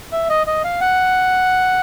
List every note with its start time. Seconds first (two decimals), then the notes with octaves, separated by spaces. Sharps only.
0.12 E5
0.29 D#5
0.47 D#5
0.64 F5
0.81 F#5